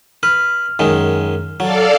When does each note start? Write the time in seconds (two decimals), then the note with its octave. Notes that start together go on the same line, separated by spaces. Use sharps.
0.23 B4 F6
0.79 F#2 D#3 G#3
1.60 F#3 A4 D5 F5